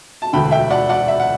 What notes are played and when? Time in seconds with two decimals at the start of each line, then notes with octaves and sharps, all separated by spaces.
0.22 A5
0.33 E1 D2 D3 G5 B5
0.51 E5 G5
0.70 D5 F#5
0.89 D5 F#5
1.08 E5
1.20 F#5